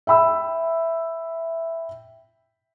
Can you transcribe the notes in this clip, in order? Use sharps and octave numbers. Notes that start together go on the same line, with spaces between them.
E5 G5 B5 E6